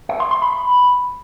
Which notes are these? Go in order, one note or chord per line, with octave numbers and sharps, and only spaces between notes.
E5
C6
C6
B5